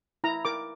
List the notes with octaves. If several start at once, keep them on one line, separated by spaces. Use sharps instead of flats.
E4 A#5
A#4 D6